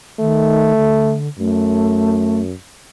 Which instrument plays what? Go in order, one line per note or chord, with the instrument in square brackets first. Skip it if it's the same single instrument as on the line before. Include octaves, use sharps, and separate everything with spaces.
[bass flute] D#3 [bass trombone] A3
[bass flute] D3
[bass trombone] F#2 [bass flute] A3